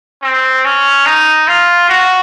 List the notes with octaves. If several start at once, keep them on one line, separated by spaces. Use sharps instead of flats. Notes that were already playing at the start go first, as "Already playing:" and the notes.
C4
C#4
D#4
F4
F#4